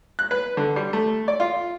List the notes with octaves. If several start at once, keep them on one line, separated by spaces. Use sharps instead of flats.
F#6
B4
D3
G3
A3
D5
F4